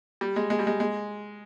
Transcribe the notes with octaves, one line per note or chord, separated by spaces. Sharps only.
G3
G#3
G#3
G3
G#3
G#3